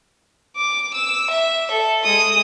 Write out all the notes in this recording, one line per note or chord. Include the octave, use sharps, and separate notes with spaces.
D6
E6
E5
A4
G#3 D#6